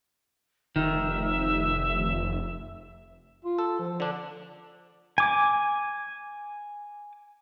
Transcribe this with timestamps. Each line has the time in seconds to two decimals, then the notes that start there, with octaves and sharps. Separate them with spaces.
0.76 F1 D#3 E5
3.44 F4
3.59 A4
3.79 F3
4.00 D3 D4
5.18 G#5 D6